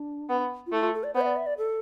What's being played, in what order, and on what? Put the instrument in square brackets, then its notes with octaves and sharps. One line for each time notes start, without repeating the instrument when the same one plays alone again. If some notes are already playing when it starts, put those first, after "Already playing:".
Already playing: [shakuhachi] D4
[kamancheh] B3
[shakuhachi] F4
[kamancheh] A3 [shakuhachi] E4
[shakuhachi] F4
A4
D5
[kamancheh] B3 [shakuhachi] C5
[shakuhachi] E5
D5
E5
D5
A4